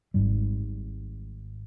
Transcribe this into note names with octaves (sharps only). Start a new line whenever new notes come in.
G#1 G#2 G3